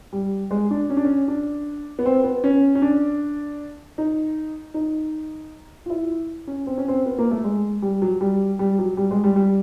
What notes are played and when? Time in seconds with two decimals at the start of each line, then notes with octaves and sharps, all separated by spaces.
0.13 G3
0.51 G#3
0.71 D4
0.90 C#4
0.97 D4
1.05 C#4
1.28 D4
1.99 B3
2.06 C4
2.24 B3
2.44 C#4
2.75 C#4
2.82 D4
3.98 D#4
4.74 D#4
5.86 F4
5.90 E4
6.47 C#4
6.67 C4
6.78 C#4
6.88 C4
7.06 B3
7.19 A#3
7.31 A3
7.44 G#3
7.82 G3
8.02 F#3
8.21 G3
8.59 G3
8.79 F#3
8.97 G3
9.11 G#3
9.24 G3
9.36 G3